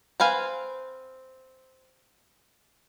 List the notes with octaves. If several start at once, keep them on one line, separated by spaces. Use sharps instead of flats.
C4 B4 F5 G#5